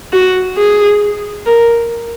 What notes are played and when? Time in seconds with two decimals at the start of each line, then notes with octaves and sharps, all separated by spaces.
0.13 F#4
0.57 G#4
1.46 A#4